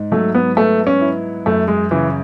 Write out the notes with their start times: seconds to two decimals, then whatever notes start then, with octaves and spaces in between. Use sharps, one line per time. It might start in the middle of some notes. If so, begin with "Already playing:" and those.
Already playing: G#2
0.12 F#3 A3
0.34 B3
0.57 A3 B3
0.87 C#4
1.01 E4
1.46 F#2 A3
1.68 G#3
1.91 C#3 E3